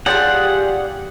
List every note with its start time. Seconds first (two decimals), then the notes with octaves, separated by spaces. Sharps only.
0.06 G3 F4 G4 G#4 D5 F#5 G5